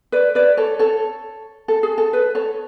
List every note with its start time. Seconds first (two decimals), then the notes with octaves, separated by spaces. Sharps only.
0.12 B4 D5
0.35 B4 D5
0.57 A4 C#5
0.79 A4 C#5
1.68 A4
1.83 G#4
1.98 A4
2.13 B4
2.35 A4 C#5